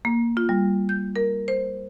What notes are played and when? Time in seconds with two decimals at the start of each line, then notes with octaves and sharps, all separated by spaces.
0.05 A#3
0.37 F4
0.49 G3
0.89 G6
1.16 A#4
1.48 C5